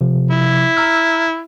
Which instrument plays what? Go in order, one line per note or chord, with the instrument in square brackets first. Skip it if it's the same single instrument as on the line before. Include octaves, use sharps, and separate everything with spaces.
[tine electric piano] C3 F3
[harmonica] E4
[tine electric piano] A#5 E6 F6